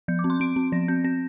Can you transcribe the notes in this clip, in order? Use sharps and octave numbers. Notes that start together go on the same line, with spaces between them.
F3 G6
D6
C4
C6
C4 D7
C4
F3 A#6
C4 G6
C4 A#6